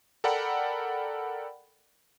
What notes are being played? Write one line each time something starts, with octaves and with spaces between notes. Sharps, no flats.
A4 A#4 D5 F#5 G5 B5